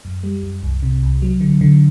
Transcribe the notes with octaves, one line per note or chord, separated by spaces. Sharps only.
F#2
G3
F#2
C2
C3
C2
F#3
D3
D3